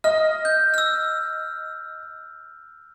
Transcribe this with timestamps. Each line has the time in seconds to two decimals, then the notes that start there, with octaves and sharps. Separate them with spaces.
0.04 D#5 F6
0.45 G6
0.74 E6 F6